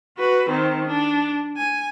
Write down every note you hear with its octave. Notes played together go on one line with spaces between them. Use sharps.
F#4 B4
D#3 C4
D4
G#5